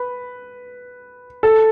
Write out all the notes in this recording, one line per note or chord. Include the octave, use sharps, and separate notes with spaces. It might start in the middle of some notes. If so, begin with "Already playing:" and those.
Already playing: B4
A4